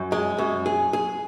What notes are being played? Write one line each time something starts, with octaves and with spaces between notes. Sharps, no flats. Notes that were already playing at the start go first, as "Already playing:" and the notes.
Already playing: F#2
G#3
F#2
G#4
G#4